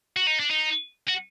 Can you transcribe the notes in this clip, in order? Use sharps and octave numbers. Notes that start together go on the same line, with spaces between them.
F#4
D#4
D4
D#4
F#4